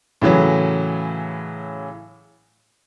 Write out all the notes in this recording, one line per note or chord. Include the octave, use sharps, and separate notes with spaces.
A2 C#3 E3 F#3